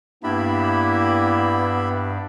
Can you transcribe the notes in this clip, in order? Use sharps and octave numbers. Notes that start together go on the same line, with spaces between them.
G2 A#3 B3 D4 E4 G4 E5 B5